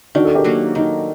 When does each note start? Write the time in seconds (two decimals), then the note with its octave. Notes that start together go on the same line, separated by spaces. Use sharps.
0.15 D#3 D4 F#4
0.25 A4
0.35 G4 A#4
0.44 F#3 A#3 F#4
0.75 D#3 D#4